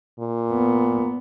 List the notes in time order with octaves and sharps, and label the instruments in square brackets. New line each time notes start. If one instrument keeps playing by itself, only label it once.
[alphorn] A#2
[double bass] B3